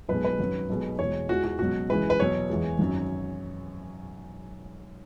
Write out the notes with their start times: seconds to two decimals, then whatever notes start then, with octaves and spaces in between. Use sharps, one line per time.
0.09 B1 B2 G#3 B4
0.24 B4
0.39 G#1 F#2 F#3
0.69 B1 B2 G#3
0.99 E2 B2 G#3 C#5
1.29 E2 E3 G#3 F#4
1.44 F#4
1.59 C#2 B2 F#3 F#4
1.89 C#2 C#3 E3 G#3 B4
2.10 B4
2.19 E2 B2 F#3 C#5
2.50 E2 E3 G#3
2.79 G#1 F#2 F#3